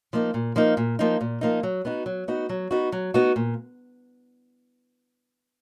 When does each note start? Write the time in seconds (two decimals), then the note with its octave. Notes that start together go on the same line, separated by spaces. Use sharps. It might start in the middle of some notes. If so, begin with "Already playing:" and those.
0.13 F3 A#3 D#4
0.34 A#2
0.56 F3 A#3 D#4
0.77 A#2
0.99 F3 A#3 D#4
1.21 A#2
1.41 F3 A#3 D#4
1.63 F#3
1.85 B3 D#4 F#4
2.06 F#3
2.28 B3 D#4 F#4
2.49 F#3
2.71 B3 D#4 F#4
2.92 F#3
3.14 B3 D#4 F#4
3.36 A#2